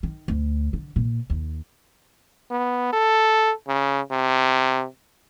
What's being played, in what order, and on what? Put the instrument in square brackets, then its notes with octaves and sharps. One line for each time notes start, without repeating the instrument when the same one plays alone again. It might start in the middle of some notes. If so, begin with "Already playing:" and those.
[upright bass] D#3
D2
D3
A#2
D#2
[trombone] B3
A4
C#3
C3